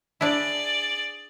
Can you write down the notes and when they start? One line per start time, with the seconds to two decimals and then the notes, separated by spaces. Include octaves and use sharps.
0.21 D4 E4 G#4 D5